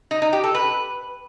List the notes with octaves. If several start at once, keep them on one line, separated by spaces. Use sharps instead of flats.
D#4
D#4
G4
A4
B4